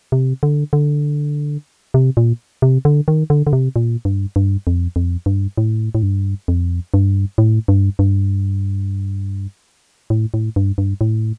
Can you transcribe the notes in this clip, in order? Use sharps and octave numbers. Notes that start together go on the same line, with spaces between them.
C3
D3
D3
C3
A#2
C3
D3
D#3
D3
D3
C3
A#2
G2
G2
F2
F2
G2
A2
A2
G2
F2
G2
A2
G2
G2
A2
A2
G2
G2
A2